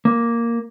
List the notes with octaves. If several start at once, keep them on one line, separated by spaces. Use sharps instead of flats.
A#3